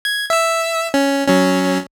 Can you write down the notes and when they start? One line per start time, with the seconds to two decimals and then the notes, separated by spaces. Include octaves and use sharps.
0.05 G#6
0.30 E5 E6
0.94 C#4
1.27 F#3 C#4